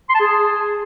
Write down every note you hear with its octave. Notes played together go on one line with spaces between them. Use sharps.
C6
A5
G#4